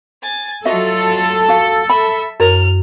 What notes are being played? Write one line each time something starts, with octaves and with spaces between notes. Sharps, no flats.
G#5 A6
F#3 F4 F#4 A4 D#5 E5
F#4 F5
E5 B5
F#2 A#4 C#5 F6